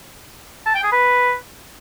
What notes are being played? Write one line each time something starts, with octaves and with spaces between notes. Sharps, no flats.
A5
G5
G#4
B4